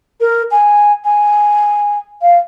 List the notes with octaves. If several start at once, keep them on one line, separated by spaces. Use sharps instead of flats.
A#4
G#5
G#5
F5